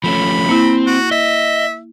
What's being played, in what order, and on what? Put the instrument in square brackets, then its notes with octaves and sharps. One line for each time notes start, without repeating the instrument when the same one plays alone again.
[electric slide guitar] F3 A3 C#4 [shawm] B5
[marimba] A#3 E4 [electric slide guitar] C4
[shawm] F#4
[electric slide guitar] D#5 [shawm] E5